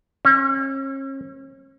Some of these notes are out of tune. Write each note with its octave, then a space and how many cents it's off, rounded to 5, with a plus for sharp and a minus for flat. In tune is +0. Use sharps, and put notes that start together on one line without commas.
C#4 -40